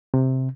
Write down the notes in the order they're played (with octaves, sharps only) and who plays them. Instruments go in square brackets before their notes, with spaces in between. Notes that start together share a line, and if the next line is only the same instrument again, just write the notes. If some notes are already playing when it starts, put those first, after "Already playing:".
[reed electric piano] C3